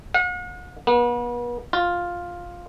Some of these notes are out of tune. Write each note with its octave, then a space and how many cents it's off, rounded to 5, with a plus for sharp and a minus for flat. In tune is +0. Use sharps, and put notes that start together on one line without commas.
F#5 -45
B3 -40
F4 +5